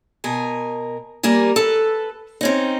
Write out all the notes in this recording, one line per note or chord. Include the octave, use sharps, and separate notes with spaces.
B2 A#4 G#5
G3 A#3 A#4 G#5
A4 B4
C4 C#4 D#4